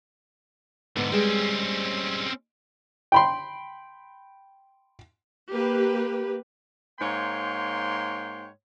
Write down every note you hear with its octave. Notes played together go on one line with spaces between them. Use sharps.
G#2 D3 B3
G3 G#3 C4 C#4
G5 B5 C6
A#3 G4 B4
G#2 A#3 C#5 G5 C6